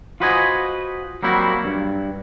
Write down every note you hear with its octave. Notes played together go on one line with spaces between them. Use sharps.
F4 F#4 B4 C5 D#5 G#5
F#3 G3 A#3 C4 E4 F#4
G2